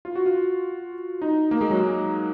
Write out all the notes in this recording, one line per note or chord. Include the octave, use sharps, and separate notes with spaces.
F4
F#4
F4
D#4
A#3
G#3
F#3
G#3